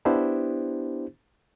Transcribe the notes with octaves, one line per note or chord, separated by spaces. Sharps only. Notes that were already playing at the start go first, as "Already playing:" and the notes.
B3 D4 E4 G4 C5